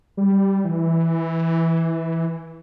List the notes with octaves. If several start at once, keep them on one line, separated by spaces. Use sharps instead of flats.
G3
E3